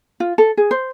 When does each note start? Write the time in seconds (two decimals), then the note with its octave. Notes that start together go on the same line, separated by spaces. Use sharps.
0.20 F4
0.38 A4
0.57 G#4
0.71 C5